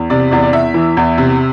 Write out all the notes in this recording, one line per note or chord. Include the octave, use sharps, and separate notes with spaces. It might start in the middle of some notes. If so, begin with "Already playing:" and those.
Already playing: E2
C3 D5
E2 D5
D5
E2 E5
E3
E2
C3